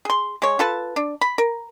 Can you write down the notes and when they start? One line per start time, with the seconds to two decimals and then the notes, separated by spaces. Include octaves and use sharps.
0.05 G#4 C6
0.42 G#3 C#5
0.59 F4 A4 B4 A5
0.96 D4
1.21 B5
1.38 A#4